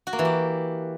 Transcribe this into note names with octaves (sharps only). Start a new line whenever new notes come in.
F#4
A#3
E3
G4